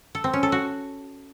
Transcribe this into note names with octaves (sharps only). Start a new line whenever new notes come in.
A4
C4
C#4
A4
F#4